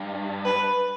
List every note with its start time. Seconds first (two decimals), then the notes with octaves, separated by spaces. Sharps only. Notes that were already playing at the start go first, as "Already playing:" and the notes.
Already playing: G2
0.45 B4